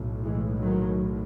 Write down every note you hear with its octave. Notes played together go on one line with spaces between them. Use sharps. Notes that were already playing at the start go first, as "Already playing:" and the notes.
Already playing: B1 A2
E3 G#3
D#3 F#3